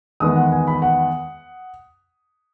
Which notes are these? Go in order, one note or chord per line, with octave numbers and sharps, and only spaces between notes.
E2 D#3 G#3 B3 D#6
F#5
G#5
B5
F#5